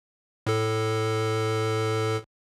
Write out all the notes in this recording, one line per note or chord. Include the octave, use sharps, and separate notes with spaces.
A2 A4